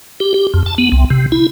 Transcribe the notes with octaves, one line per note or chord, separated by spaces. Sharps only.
G4
G4
F2
A5
B3
C2
C3
E4